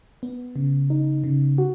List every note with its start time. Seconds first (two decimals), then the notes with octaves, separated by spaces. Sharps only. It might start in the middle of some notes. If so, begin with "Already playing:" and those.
0.23 B3
0.56 C#3
0.90 D#4
1.24 C#3
1.58 F#4